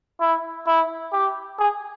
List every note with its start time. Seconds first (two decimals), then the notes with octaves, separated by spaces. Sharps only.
0.20 E4
0.67 E4
1.13 G4
1.59 G#4